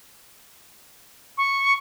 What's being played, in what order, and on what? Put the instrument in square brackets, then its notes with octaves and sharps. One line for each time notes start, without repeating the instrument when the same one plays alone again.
[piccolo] C#6